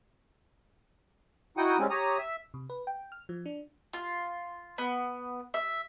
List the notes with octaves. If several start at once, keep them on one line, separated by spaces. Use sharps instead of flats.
D#4 E4 F#4 F#5 G5 D#6
G3 G#3 C4 C#4
G4 C#5 A#5 D#6
E5
C3
B4
G5
F6
F3
D4
F4
B3
E5